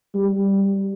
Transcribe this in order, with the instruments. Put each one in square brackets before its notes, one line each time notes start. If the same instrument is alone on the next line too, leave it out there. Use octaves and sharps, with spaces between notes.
[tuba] G3